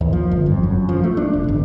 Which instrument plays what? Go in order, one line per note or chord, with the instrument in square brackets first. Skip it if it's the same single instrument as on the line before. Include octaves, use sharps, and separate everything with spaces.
[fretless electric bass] D#2
F3
G1
F2
F#2
F3
A3
D4
E1
G1